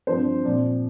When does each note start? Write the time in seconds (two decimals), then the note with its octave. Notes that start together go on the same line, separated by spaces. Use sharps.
0.07 G2 F3 C4 C5
0.44 A#2 F3 C4 D5